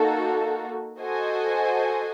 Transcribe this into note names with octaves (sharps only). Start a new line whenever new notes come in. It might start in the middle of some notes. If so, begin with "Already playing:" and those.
Already playing: A#3 D#4 F#4 A4
F#4 A4 C5 D#5 G#5